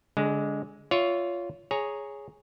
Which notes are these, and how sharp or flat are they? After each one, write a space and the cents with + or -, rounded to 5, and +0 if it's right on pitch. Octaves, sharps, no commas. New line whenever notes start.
D3 -25 G#3 +0
F4 +0 C#5 +25 E5 +0
G#4 +0 C#5 +0 A#5 +0